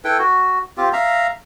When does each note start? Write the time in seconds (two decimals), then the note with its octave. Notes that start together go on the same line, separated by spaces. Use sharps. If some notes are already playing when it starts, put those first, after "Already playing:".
0.04 E4 A4 B4 G5
0.19 F#4
0.77 C4 F4 G4
0.93 E5 F5 A#5